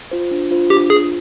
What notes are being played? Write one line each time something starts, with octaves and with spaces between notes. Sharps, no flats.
F4 C5
D4
F4 C5
D4 G4
F4 G#4 C5